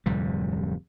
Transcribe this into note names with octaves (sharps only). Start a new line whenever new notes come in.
D1 F2 C3 G3